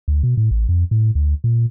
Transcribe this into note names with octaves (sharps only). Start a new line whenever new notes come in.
D2
B2
A2
A1
F2
A2
D2
A#2